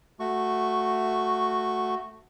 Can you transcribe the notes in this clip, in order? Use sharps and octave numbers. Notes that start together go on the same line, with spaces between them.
A3 F#4 C#6